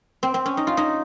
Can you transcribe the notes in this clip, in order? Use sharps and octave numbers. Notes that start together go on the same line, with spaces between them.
C4
C4
C#4
D#4
F4
D#4